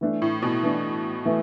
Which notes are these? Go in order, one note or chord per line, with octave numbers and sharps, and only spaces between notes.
E3 A3 D4
A2
B2
E3 A3 D4
E3 A3